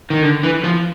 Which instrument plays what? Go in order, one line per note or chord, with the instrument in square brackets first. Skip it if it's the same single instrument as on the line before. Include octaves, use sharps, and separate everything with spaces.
[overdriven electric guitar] D#3
D3
E3
F3